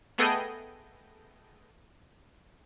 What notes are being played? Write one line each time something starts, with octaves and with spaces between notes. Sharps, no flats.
A3 B3 G#4 A4 D#5 G5